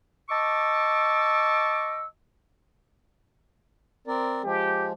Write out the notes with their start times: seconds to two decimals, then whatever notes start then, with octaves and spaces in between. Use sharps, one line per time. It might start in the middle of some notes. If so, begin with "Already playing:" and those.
0.29 D#5 A5 C#6 D6 E6
4.07 C4 A#4 D5
4.44 F3 G#3 G4